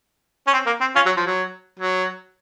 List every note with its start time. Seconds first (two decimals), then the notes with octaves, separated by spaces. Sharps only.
0.47 C#4
0.53 C4
0.67 A#3
0.81 C4
0.95 C#4 F4
1.06 F#3
1.17 F3
1.27 F#3
1.80 F#3